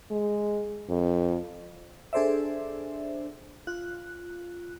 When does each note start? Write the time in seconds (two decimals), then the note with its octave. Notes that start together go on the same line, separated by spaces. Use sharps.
0.11 G#3
0.89 F2
2.13 D4 G#4 A4 C5 D5 E5
3.67 F4 F#6